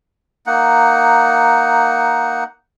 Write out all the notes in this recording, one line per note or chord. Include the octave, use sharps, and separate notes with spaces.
A#3 D#4 F#5